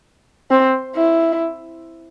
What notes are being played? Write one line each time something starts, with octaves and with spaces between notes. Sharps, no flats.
C4
E4